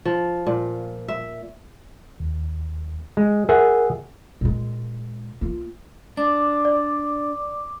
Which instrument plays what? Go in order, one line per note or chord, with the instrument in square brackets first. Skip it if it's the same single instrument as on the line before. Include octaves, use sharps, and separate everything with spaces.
[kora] F3
A#2
E5
[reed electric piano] D#2
[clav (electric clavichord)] G#3
[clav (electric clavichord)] G#4 E5 F#5 [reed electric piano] A#4
[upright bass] A#2 G#3
A#3 F4
[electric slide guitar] D4 [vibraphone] D6
[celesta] D5